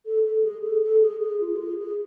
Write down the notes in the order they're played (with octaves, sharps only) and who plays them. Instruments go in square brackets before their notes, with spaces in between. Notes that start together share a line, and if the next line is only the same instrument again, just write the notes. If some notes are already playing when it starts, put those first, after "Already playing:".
[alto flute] A4
A4
G#4
A4
A4
G#4
G#4
F4
A4
G#4
G#4